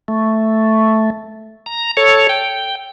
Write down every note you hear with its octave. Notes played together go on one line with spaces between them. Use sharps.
A3
A#5
A4 C#5
G5